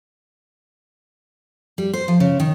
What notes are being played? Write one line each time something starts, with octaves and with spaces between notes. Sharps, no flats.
G3
C5
F3
C#3
D#3